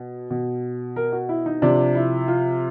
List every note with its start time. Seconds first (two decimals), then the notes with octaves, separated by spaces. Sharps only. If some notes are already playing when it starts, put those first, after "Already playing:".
Already playing: B2
0.30 B2
0.96 A#4
1.12 F#4
1.29 E4
1.46 D#4
1.62 C3 F3 D4
1.95 E4
2.28 F4